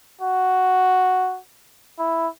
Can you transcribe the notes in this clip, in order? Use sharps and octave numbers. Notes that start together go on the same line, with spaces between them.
F#4
E4